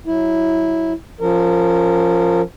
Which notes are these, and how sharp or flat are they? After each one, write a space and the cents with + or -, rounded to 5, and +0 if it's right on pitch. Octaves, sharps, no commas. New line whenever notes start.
F#3 +0 E4 -10
F3 +0 C#4 +0 A#4 -25